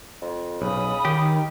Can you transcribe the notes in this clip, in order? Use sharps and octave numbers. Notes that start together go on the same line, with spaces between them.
F2
B1 C#3 B5 D#6
D#3 G4